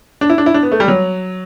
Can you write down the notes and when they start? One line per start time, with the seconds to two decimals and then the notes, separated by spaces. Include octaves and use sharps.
0.21 D4
0.30 E4
0.38 D4
0.46 E4
0.54 D4
0.63 B3
0.72 A3
0.80 G3
0.88 F#3